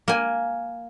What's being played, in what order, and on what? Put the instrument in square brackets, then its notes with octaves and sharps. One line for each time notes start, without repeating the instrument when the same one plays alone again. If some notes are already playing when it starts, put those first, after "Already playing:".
[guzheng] A#3 G#5